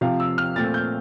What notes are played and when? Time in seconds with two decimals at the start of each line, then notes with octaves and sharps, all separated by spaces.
0.01 C3 F3 C4 F5
0.20 E6
0.38 F6
0.56 A#2 A3 C4 A6
0.74 G6